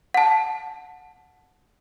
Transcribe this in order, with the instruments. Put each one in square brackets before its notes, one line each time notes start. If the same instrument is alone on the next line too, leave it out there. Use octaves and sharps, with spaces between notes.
[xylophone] F#5 A5